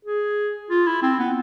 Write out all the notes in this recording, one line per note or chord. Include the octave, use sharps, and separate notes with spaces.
G#4
F4
E4
C4
B3